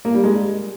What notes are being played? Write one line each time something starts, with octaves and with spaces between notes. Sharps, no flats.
A#3
G3
G#3